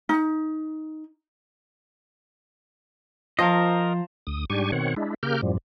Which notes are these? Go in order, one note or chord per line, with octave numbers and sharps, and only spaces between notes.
D#4
F3 F4 A#4 C5 D#5 A5 A#5
D2 D#6
G#2 G3 D4 G4 G#5 C#6
B2 D#3 C4 C#5 F#5
G#3 D4 E4
C#3 A#3 G4 A#4 F6 G6
F#2 A2 F3 G3